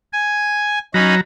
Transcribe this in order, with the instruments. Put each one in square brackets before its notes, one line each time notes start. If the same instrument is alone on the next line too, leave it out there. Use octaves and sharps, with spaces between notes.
[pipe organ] G#5
[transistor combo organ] F#3 A#5 [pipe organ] C#4 D#4 B5